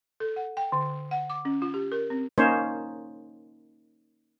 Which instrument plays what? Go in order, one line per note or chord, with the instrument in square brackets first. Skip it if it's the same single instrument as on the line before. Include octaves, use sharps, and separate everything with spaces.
[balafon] A4
F#5
G5
D3
F#5
D6
C#4
F4
G4
A#4
C4
[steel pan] A#3 C#4 D#4 C5 C#5